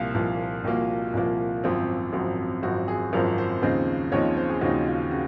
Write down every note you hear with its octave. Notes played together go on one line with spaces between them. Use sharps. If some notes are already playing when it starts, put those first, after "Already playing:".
Already playing: C2 A#2 F3 A#3 F5
C2 A#2 F3 A#3
C2 A#2 F3 A#3 F#4
C2 A#2 F3 A#3
G#1 F#2 F3 C4
G#1 F#2 F3 C4 F#4
G#1 F#2 F3 C4 F#4
G#4
G#1 F#2 F3 C4 A#4
C5
D#2 C#3 F3 C4 D#4 C5
D#2 C#3 F3 C4 D#4 C#5
C5
G#4
D#2 C#3 F3 C4 D#4 F#4
F4
C#3 F#4